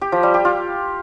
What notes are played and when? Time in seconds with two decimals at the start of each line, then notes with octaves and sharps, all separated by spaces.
0.01 G4
0.12 F3
0.23 G3
0.34 G4
0.45 F4